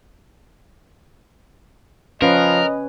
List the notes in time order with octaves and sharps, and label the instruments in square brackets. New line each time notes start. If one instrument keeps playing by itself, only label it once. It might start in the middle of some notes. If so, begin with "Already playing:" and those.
[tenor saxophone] F3 [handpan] C#4 B4 [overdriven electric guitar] A#4 [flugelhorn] D#5